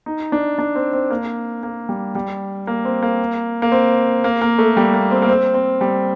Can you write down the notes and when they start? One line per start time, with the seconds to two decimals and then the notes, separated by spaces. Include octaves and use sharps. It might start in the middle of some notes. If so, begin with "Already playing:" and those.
0.06 D#4
0.32 D4
0.59 D4
0.75 C4
0.93 C4
1.10 A#3
1.63 A#3
1.89 G3
2.15 G3
2.67 A#3
2.85 C4
3.03 A#3
3.62 A#3
3.72 C4
4.24 A#3
4.41 A#3
4.59 A3
4.77 G3
4.94 A#3
5.11 C4
5.22 A#3
5.29 C4
5.54 C4
5.81 G3